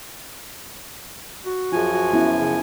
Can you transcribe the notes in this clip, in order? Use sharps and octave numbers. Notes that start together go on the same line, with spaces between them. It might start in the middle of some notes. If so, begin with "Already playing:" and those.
F#4
F#2 F3 F4 G#4 G#5
F#4
B3 C#4 E4
C#3